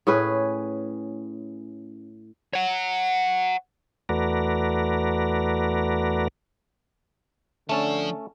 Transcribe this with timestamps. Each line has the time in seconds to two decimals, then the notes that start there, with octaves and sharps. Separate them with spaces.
0.07 A2 C#4 G#4 B4
2.53 C#5 F#5
4.09 E2 A3 F#4 B4 D5 A#5
7.69 D3 F3 A3 C#4 A4 A5